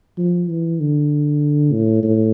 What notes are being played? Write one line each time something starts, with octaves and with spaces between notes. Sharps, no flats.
F3
E3
D3
A2
A2